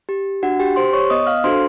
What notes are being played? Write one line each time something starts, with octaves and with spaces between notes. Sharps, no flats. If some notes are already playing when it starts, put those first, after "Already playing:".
G4
D4 F#4 F#5
G4 G5
G4 C5 C6
C#5 C#6
B3 D#5 D#6
F5 F6
D4 F#4 A4 C5 C6